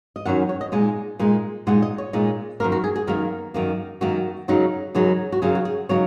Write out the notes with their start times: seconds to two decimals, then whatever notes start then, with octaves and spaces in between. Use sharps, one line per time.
0.16 D#5
0.25 F#2 D#3 F#3 C#4 F#5
0.49 C#5
0.61 D#5
0.72 A#2 G#3 D#4 G#5
1.19 A#2 G#3 D#4
1.67 A#2 G#3 D#4 F#5
1.82 D#5
1.98 C#5
2.13 A#2 G#3 D#4
2.60 F#2 D#3 A#3 A#4
2.72 F#4
2.84 G#4
2.96 G#4
3.07 F#2 D#3 A#3 A#4
3.54 F#2 D#3 A#3
4.01 F#2 D#3 A#3 F#4
4.48 F#2 C#3 F#3 D#4
4.95 F#2 C#3 F#3 D#4 G#4
5.32 F#4
5.42 F#2 C#3 F#3 D#4 G#4
5.55 F#4
5.65 G#4
5.89 C#3 F#3 D#4 C#5